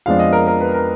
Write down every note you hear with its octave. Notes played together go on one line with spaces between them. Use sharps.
F2 F3 G#3 B3 D4 F5
D#5
A#4
A#4
B4
A#4